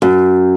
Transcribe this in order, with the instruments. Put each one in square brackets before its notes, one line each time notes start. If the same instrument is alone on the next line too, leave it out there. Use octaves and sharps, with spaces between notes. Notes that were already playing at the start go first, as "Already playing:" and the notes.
[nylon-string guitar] F#2